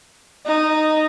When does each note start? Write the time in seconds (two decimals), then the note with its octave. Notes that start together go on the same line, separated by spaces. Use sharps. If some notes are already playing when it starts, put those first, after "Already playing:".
0.46 D#4